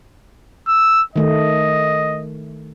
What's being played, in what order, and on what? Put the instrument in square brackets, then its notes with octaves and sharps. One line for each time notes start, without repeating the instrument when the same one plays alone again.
[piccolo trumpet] E6
[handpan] D#3 A3 [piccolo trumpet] D#5